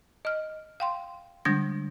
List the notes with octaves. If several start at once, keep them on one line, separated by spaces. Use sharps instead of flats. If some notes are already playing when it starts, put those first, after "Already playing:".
D#5 F6
F5 G5 C6
D3 G3 G#3 D4 A#6